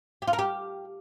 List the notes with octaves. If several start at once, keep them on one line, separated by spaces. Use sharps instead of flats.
G4
F4
A#4
G4